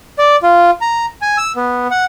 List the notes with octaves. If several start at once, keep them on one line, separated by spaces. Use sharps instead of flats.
D5
F4
A#5
G#5
E6
B3
F#5